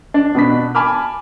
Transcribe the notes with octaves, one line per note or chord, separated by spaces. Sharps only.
D4
B2 B3 D4 B6
G#5 A5 B5 D6 F6